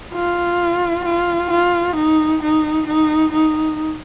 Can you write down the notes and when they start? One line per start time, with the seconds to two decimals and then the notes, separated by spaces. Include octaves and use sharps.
0.14 F4
1.05 F4
1.50 F4
1.96 D#4
2.42 D#4
2.87 D#4
3.32 D#4